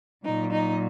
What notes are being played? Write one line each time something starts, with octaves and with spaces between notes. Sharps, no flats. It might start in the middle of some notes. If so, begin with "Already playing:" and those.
A#2 F#3 D#4
D#4